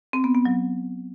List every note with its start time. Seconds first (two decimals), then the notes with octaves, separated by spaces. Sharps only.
0.13 C4
0.24 B3
0.35 B3
0.45 F#3